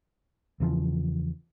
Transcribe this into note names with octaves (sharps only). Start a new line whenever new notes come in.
E2 C#3 E3 F3